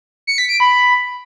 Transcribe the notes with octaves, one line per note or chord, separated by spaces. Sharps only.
C#7
B6
D7
B5